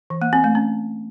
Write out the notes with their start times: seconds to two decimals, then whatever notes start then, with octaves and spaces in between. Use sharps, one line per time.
0.10 E3
0.22 A#3
0.33 C4
0.44 A3
0.55 C#4